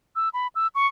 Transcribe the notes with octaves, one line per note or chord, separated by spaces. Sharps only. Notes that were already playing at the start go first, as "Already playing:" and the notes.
E6
B5
E6
C#6